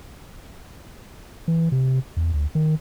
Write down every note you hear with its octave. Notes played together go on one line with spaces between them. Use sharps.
E3
C3
E2
D2
D#3